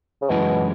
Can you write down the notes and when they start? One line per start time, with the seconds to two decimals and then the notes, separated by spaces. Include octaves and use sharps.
0.22 C#3
0.30 F#2 B2 E3 G#3 C#4 E4